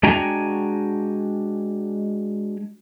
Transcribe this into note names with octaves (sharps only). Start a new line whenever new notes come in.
G#3 D4 F#4 G5 G#5 A#5